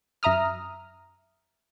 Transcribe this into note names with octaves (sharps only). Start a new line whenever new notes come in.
F#2 E5 A#5 D#6 F6